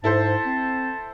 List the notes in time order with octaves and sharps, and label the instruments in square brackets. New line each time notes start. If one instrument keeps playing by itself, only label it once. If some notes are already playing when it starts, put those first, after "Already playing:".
[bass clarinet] G#2 [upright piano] E4 A4 C5 [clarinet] A5
[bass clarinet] C4